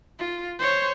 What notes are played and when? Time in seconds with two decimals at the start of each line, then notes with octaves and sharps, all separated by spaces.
0.19 F4
0.59 C5 C#5